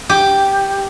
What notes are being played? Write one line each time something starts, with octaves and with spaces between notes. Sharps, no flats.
G4